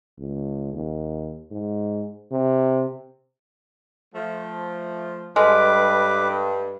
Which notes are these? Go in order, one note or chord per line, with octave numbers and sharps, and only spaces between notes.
C#2
D#2
G#2
C3
F3 A3
G2 G#3 A4 B4 D6 F6 B6